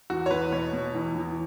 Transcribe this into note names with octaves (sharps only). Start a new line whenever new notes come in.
E2 F#4
C#5
E2 B4
B2 C#5
B2
E2
E2